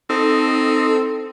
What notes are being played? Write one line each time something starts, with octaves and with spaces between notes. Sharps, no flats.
C4 D#4 A4